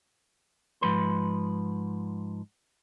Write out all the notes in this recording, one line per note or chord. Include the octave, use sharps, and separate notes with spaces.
G#2 F3 B4 C6